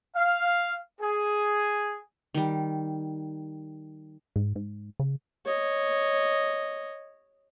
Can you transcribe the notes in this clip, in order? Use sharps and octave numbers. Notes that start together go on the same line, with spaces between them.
F5
G#4
D#3 G3
G#2
G#2
C#3
C#5 D#5